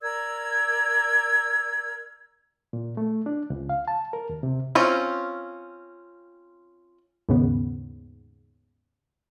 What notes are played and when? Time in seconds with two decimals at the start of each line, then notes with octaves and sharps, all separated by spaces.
0.02 A#4 D5 E6 G#6
2.73 A#2
2.97 A3
3.26 D4
3.50 C#2
3.69 F5
3.88 A5
4.13 A#4
4.29 D#2
4.43 C3
4.75 C4 C#4 F4
7.29 D#2 G#2 C#3 B3